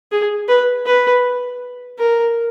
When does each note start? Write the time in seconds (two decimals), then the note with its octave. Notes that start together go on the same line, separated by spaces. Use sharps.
0.12 G#4
0.48 B4
0.86 B4
1.99 A#4